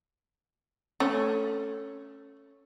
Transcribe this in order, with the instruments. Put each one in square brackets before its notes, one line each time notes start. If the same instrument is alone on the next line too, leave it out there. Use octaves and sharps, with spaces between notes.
[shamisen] A3 [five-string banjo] C#4